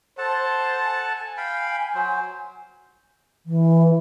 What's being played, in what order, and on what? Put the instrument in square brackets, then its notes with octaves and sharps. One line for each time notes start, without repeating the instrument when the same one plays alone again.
[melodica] A4 F#5 A5 [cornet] C5
[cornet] G#5
[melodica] F5 G5 B5
F#3 C5
[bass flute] E3